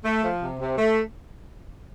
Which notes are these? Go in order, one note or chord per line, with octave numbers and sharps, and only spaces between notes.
A3
F3
C3
C3
A3